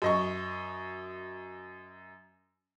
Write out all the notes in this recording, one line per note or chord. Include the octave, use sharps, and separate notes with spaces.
F#2 D#5 C#6